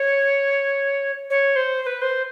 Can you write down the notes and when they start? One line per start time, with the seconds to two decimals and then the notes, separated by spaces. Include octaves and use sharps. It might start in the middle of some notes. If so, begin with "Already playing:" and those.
Already playing: C#5
1.30 C#5
1.56 C5
1.82 C5
1.86 B4
2.02 C5